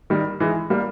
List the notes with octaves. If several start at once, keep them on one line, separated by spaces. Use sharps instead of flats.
D#3 G3
E3 G#3
G3 A#3